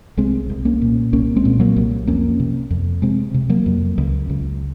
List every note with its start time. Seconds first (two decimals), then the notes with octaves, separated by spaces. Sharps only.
0.17 C2 G#3 C4
0.49 C2
0.65 A#3 C#4
0.82 A#2
1.13 C2 A#3 C#4
1.36 G#3 C4
1.45 A#2
1.60 F#3 A#3
1.76 C2
2.07 F2 A#3 C#4
2.40 C3
2.71 F2
3.02 C3 G#3 C4
3.34 C3
3.49 F#3 A#3
3.66 F2
3.98 C#2
4.30 C#2